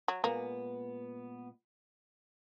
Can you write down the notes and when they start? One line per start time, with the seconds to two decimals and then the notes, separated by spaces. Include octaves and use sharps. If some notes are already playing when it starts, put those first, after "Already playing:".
0.08 F#3
0.24 A#2 G#3 A#3 B3